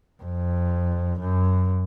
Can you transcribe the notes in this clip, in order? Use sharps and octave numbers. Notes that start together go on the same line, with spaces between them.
F2
F#2